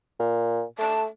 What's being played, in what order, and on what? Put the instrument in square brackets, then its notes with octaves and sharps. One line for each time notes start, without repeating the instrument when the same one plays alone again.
[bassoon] A#2
[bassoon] A3 [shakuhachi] A5